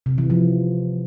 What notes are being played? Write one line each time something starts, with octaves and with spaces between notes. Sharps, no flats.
C3
E3
F3